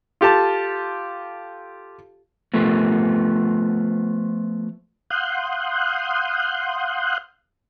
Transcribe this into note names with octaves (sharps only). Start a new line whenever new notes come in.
F4 G4 A4 A5
F3 A3 B3
F5 F#5 C6 D#6 F#6 G6